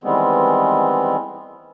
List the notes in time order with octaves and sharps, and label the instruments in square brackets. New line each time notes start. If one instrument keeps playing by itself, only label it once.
[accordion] D#3 E3 G3 G#3 B3 C4